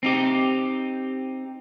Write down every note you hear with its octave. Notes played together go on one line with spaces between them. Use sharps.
C4 D#4 G4